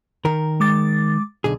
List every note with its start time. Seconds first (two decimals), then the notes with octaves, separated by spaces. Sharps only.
0.25 D#3 A#4
0.60 G#3 D6 A6
1.44 B1 D3 G#4